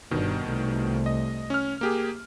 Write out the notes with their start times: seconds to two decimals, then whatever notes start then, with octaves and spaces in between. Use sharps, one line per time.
0.11 G1 B2 D3 D#3
0.46 C2 A3
1.06 D#5
1.50 C#4 F6
1.81 A#3 G4 G#4